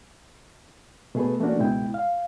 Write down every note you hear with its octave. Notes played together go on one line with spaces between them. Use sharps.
B2 A3 G#4 A4 B4
E3 A3 A#3 C#4 D4 F#4
C#2 G#2 B2 G#3 E4 G5
F5